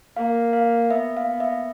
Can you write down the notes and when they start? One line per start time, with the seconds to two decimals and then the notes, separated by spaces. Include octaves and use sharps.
0.17 A#3 F5
0.53 F5
0.91 B3 E5
1.17 F5
1.28 B3
1.40 E5